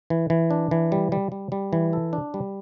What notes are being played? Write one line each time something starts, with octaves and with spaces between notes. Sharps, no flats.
E3
E3
D4
E3
G3
G3
G3
G3
E3
A4
D4
G3